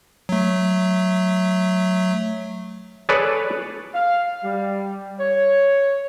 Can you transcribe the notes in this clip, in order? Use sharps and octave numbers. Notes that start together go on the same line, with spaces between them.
F#3 A3
G#4 A4 B4 C#5 D5
F5
G3
C#5